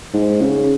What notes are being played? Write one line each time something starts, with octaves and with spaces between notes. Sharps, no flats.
G#2
C#3